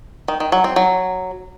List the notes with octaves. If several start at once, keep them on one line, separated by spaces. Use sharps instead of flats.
D#3
D#3
F#3
C4
F#3